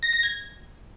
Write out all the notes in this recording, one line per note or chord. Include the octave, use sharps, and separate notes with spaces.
A#6
A#6
G#6